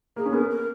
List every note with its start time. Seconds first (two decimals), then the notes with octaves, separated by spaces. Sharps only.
0.16 A#3 G#4
0.25 C#4
0.32 B3 A#4
0.49 A#4